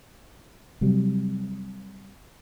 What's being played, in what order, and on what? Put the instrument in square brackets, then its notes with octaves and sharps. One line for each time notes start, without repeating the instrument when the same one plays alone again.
[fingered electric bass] C3 F#3 G3